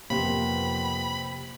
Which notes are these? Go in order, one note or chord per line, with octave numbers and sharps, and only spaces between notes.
F2 C3 A#3 B3 B5